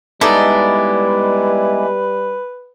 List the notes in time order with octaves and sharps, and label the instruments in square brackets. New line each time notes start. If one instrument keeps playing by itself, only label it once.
[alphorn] G3 [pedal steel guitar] G#3 B3 E4 [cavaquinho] D#4 A4 D5 [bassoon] B4